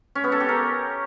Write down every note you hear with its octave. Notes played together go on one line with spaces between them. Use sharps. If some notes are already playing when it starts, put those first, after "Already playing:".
C#4
B3
A4
G4
A#4